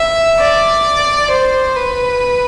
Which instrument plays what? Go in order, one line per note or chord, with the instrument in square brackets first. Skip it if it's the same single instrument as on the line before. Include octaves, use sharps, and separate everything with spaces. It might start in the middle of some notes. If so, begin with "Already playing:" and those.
Already playing: [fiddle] E5
D5
C5
B4